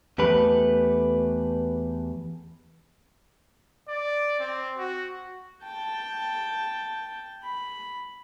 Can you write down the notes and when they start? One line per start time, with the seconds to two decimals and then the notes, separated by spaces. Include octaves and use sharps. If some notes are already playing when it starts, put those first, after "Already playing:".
0.18 E2 A3 G4 B4
3.88 D5
4.40 C4
4.77 F#4
5.63 G5 A5
7.43 B5